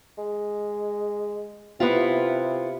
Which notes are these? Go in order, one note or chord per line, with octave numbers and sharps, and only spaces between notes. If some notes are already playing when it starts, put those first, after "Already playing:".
G#3
C3 B3 E4 F4